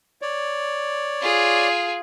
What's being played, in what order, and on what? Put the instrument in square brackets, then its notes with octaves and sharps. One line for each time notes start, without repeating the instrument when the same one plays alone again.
[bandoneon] C#5 D5
[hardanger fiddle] F4 G#4